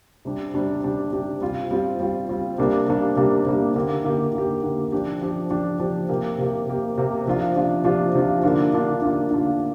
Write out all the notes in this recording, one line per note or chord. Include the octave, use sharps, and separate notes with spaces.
C3 G3 D4 G4
C3 G3 D4 G4
C3 G3 D4 G4
C3 G3 D4 G4
G3 C4 F4
G3 C4 F4
G3 C4 F4
G3 C4 F4
C3 G3 A#3 D4
C3 G3 A#3 D4
C3 G3 A#3 D4
C3 G3 A#3 D4
D3 A#3 G4
D3 A#3 G4
D3 A#3 G4
D3 A#3 G4
F3 D4 G4
F3 D4 G4
F3 D4 G4
F3 D4 G4
C3 A#3 G4
C3 A#3 G4
C3 A#3 G4
C3 A#3 G4
C3 F3 D4 F4
C3 F3 D4 F4
C3 F3 D4 F4
C3 F3 D4 F4
D3 A#3 D4 F4
D3 A#3 D4 F4
D3 A#3 D4 F4
D3 A#3 D4 F4